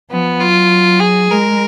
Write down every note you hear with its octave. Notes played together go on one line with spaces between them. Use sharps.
F3 B3
F#3 F4
G#4
G#3 A#4